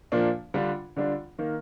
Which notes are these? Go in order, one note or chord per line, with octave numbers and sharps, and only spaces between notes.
A#2 F3 A#3 D4
D3 G3 D4 F4
D3 G3 D4 F4
D#3 A#3